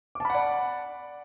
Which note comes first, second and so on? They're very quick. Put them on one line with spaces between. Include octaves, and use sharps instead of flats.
D6 A5 B5 F#5 D5